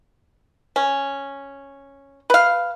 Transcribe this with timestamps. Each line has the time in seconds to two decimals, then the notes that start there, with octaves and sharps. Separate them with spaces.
0.76 C#4
2.30 B4 F5